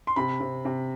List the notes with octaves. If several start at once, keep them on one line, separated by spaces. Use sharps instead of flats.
C6
C3 B5
C3
C3